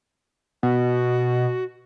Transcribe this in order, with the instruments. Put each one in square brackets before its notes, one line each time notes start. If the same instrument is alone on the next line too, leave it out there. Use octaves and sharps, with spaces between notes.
[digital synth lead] B2 [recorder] F#4